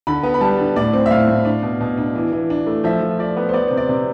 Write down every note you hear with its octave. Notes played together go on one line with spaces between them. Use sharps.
D3 B5
B3
B5
G3 A5
D3
A2 D5
C4
E5
A2 F5
A2
D4
B2
B2
D4
E3
E3
D4
A3
F3 E5
F3
F3 D5
B3
C5
B3 D5
C3 C5
D5
C3